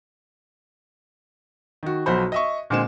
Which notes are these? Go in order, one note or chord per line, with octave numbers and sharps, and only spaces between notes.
D#3 F#4
B1 F3 F#3 F#4 C5 B5
D#5 E5 C#6
A#2 D3 G#3 C4 E7